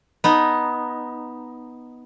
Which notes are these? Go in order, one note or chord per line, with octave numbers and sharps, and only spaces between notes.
B3 D#4